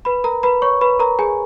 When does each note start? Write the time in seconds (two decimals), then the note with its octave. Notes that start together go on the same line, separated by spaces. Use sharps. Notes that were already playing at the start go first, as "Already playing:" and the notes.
0.05 B4 B5
0.24 A#4 A#5
0.43 B4 B5
0.62 C#5 C#6
0.81 B4 B5
0.99 A#4 A#5
1.19 G#4 G#5